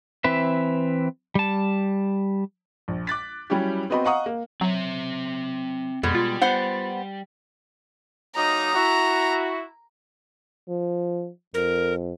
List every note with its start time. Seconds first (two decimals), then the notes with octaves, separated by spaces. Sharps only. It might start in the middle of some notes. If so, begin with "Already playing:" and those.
0.24 E3 C4 B4 E5
1.35 G3 A5
2.88 A#1
3.07 D6 F#6 A6 B6
3.50 F#3 G3 C#4 E4 G4
3.90 B3 C4 F#4 D#5 G5 B5
4.04 D#5 F5 F#5 A#5 C#6 D#6
4.26 A#3
4.61 F#3 C4 E5
6.03 F2 B2 G3 G#3
6.15 F4
6.41 B3 C5 F#5
8.36 F#3 A#3 D#4 A#5
8.74 E4 F#4
10.69 F3
11.54 F2 A#4